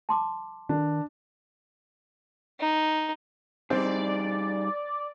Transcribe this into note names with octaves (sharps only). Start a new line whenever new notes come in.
A5 C6 D6
D#3 D4
D#4
G3 C4 D#4 G#4 D5